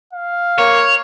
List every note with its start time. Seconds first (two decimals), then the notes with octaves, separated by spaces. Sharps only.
0.13 F5
0.58 A#3 C#5